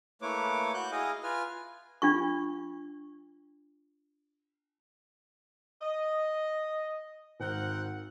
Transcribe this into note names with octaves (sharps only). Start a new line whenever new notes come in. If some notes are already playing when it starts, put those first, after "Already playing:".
A3 A#3 E4 B4 C#5 D6
F#4 F#6 G6
E4 G#4 D#5 F5
F4 B4 G#5 F6
D4 F4 C#6
D#5
G#1 C4 A#4 F#5